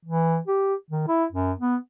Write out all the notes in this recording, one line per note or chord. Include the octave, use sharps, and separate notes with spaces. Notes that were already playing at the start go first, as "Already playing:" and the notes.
E3
G4
D#3
E4
F#2
B3